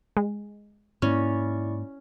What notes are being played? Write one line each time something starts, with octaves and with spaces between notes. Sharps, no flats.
G#3
G#2 A#3 C#4 E4 D5 C#6